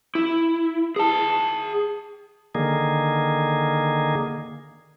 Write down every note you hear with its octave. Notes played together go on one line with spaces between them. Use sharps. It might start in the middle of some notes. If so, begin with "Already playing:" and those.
E4
G#4 A5
D3 D#3 A#3 G#4